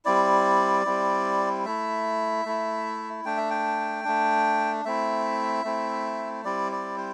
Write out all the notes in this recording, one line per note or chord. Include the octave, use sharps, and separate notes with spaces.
G3 C4 E4 D5
G3 C4 E4
A3 E4 E5
A3 E4
A3 D4 G5
E5
G5
A3 D4
A3 C4 E4 E5
A3 C4 E4
G3 C4 E4 D5
D5
C5